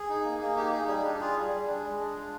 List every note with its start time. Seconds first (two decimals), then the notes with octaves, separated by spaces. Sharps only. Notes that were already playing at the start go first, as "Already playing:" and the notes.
Already playing: G#4
0.09 D#4
0.24 A#3
0.41 A#3 G#4
0.56 D#4 G4
0.72 D#4 G#4
0.88 G3 G#4
1.04 D4 G4
1.20 F4 G#4
1.36 G3
1.52 G3
1.67 D4
1.84 G#3
1.99 D4
2.16 F4